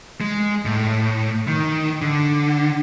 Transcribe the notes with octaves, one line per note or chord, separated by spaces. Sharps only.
G#3
A2
D#3
D3